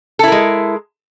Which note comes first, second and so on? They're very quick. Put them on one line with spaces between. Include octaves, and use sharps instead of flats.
A4 E4 A#4 G#3